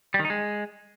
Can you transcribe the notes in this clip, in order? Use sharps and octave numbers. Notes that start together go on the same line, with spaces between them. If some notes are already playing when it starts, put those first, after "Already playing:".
G3
D#3
D#4
G#3